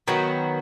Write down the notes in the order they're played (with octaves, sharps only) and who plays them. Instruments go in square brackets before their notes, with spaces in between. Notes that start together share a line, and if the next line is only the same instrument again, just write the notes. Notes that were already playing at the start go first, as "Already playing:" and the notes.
[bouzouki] D#3 F#3 B3 F#4